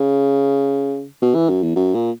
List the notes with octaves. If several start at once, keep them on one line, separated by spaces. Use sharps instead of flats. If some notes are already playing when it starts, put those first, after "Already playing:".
Already playing: C#3
B2
E3
F#2
E2
F#2
A#2